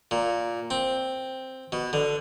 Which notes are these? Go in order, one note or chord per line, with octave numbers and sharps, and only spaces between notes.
A#2
C4
B2
D3